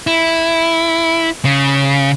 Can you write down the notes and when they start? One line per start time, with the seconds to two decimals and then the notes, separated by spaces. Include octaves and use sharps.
0.07 E4
1.45 C#3